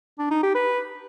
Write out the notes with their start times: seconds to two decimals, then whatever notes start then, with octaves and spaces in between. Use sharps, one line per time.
0.19 D4
0.31 D#4
0.43 G4
0.55 B4